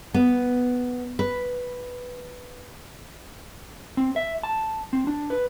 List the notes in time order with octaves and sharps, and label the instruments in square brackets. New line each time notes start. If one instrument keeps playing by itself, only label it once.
[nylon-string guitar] B3
B4
[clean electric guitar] C4
E5
A5
C4
D4
B4